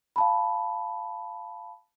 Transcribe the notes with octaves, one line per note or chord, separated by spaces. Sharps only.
F5 A5 B5